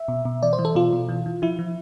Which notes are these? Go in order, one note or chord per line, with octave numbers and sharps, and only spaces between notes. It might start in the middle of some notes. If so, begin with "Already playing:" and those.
Already playing: E5
B2
B2
E3 D5
C5
E3
A4
B2 F4
B2
E3
E3
F3 E4
F3